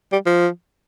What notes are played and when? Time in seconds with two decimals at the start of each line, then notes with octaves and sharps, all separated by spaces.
0.12 G3
0.26 F3